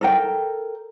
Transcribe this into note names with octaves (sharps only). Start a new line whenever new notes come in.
A4 A#4 G5